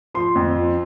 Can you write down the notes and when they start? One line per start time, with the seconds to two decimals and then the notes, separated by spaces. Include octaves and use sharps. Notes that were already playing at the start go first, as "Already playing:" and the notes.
0.14 F3 C6
0.35 F2
0.56 F3